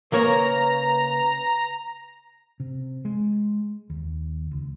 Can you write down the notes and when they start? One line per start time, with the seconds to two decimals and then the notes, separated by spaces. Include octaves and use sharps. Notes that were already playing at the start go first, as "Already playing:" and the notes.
0.12 C#3 A#3 B4 C#5 A#5
2.60 C3
3.05 G#3
3.90 D#2
4.51 C#2